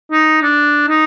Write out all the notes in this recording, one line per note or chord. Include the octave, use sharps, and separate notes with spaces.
D#4
D4
D#4